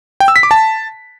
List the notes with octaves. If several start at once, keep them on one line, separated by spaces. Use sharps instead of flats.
G5
E6
B6
D6
A5